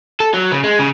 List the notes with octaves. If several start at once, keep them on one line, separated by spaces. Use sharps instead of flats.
A4
F#3
C#3
G#3
C#3